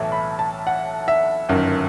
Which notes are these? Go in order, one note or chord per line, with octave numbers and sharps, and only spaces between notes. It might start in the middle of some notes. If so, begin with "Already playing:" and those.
Already playing: B1 A2 E3 A5
B5
A5
F#5
E5
G1 F#2 D#3